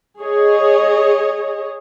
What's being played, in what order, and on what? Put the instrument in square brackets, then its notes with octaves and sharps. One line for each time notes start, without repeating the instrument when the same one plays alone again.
[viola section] G#4 C#5 D#5